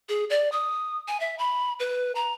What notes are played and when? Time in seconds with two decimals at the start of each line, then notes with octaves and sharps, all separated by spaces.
0.09 G#4
0.30 D5
0.52 D#6
1.08 G#5
1.20 E5
1.39 B5
1.80 B4
2.15 A#5